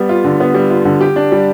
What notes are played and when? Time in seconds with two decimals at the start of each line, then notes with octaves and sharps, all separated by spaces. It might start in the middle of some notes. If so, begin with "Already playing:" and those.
Already playing: G3 B3
0.09 F4
0.25 D3
0.40 B3
0.54 G3
0.70 F4
0.85 D3
1.01 G4
1.16 D4
1.32 G3